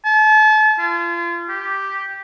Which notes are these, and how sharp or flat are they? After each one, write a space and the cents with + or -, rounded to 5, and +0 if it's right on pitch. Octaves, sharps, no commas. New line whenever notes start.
A5 -35
F4 -35
G4 -5